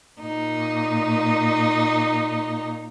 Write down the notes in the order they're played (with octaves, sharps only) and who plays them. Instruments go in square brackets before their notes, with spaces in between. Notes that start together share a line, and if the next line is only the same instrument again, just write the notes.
[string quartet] A#2 D#4